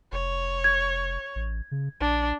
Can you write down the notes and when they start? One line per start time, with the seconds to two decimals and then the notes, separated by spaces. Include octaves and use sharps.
0.12 F1 C#5
0.64 G#6
1.35 A1
1.71 C#3
2.00 A#1 D4